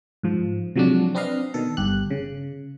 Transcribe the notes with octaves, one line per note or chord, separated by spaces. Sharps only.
G#2 F3
C3 F3 F#3 G#3 D4
C4 D4 B4 D#5 F5
B2 D#3 A4
G1 G4 F#6
C#3